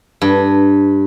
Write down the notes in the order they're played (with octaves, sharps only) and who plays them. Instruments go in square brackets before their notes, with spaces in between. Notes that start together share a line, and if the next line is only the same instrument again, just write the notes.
[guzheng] G2